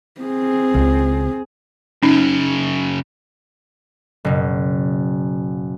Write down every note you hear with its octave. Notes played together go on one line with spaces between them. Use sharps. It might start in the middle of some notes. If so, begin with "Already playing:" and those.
C4 G#4
C#2
F#2 C#3 C#4 D#4
F#1 B2